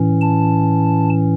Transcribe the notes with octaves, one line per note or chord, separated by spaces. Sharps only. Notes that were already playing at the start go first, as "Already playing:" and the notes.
Already playing: A2 E3 C#4
A5